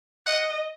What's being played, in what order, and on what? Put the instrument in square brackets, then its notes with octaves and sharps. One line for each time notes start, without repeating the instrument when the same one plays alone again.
[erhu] D#5 [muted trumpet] F#5